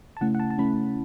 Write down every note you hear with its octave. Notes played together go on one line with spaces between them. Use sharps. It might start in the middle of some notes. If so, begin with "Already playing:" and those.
A5
C#3 A3 C#4 E4 F#5
F#5
A5
A5
C#3 A3 C#4 E4 B5